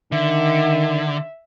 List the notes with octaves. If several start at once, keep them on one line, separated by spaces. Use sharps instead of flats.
D3 D#3 E5